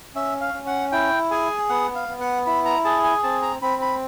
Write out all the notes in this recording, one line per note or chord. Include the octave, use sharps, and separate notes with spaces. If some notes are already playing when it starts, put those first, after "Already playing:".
C#4 E5
F5
C#4
F#5
E4 G5
G#4 G#5
B3 F#5
F5
B3
F#5
E4 B5
A#5
G#4 A5
G#5
C4 A5
A#5
C4 B5
B5